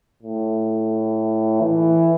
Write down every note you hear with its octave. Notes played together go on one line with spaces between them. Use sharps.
A2
E3